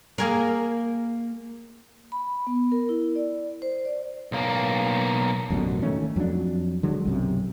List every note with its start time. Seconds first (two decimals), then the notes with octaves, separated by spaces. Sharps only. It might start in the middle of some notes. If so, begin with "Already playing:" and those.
0.18 A#3 G#4 A#4
2.12 B5
2.47 B3
2.72 A#4
2.89 E4
3.16 D5
3.62 C5
3.85 D5
4.32 B1 A#3
5.50 A1 F#2 B2 D3
5.82 D#3 A3 C#4
6.16 F2 F#3 C4 D4
6.83 D3 F#3 G#3
7.05 B1 F#2 C3